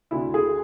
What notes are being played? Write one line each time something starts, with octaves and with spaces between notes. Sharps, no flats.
D2 D3 E4
G#4